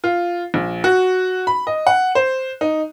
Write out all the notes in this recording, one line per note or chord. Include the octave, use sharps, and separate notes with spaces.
F4
A#1
F#4
B5
D#5
F#5
C5
D#4